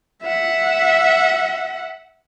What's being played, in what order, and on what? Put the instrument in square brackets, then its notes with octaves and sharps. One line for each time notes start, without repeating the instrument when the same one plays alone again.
[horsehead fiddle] E5 F#5